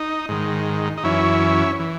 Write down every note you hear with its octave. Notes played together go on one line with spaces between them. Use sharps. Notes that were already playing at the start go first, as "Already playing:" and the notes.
Already playing: D#4
G#2 D#3
D#4
F#2 E3 C#4 E4
E3